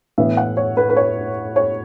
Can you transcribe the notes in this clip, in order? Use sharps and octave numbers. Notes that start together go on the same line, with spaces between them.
A2 E3 B3 E5
F#5
C#5
B4
B4
C#5
C#5